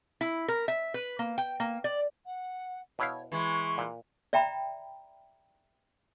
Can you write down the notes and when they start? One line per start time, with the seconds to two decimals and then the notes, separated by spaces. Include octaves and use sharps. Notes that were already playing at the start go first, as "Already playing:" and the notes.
0.21 E4
0.48 A#4
0.68 E5
0.94 B4
1.19 A#3
1.38 G5
1.60 A#3
1.84 D5
2.25 F#5
2.99 B2 E4 C#5 F5
3.32 E3 G#3 C#6
3.78 A#2
4.33 D5 E5 G5 A#5 B5